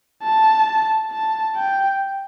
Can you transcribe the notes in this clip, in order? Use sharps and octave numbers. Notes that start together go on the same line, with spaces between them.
A5
A5
G5